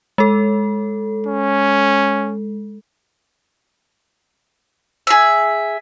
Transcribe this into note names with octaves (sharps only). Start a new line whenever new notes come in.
G#3 A4
C#4
G#4 E5